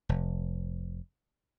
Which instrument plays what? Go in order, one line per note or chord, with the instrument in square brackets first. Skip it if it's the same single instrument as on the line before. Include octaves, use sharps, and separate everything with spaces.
[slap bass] F1